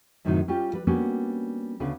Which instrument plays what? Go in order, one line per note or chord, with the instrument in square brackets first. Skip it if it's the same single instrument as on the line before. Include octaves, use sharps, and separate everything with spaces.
[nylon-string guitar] F#2 A2 C3 D#3 F#3 D#4
G3 C#4 F4 G4
G3 B4
G3 A#3 B3 C#4 D4 F#4
D2 C#3 B3 D4 B4